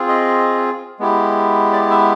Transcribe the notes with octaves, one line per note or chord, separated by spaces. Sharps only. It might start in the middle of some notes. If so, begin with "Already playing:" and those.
Already playing: C4 F4 G#4
D#5
G#3 B3 E4 G4
D5
E5